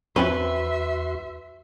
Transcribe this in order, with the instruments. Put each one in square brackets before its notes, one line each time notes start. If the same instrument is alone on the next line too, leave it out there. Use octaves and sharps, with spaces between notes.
[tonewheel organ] E2 F#4 C6 [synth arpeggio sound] F3 C4 C#4 [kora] B4 [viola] E5